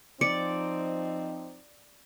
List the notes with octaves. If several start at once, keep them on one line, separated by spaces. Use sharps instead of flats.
F3 C4 D#4 D5 C#7